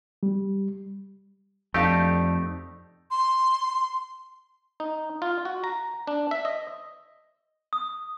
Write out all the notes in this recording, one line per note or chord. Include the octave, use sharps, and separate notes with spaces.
G3
F2 A3 D4 D#4 G4 F5 A5
C6
D#4
F4
F#4
A#5
D4
E5
D#5
D#6